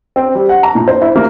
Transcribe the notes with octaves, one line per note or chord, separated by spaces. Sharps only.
C4
G3
F#5
A#5
A#2
C5
E4
A#3